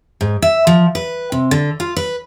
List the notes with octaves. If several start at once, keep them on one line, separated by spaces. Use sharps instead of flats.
G#2
E5
F3
B4
C3
D3
F4
B4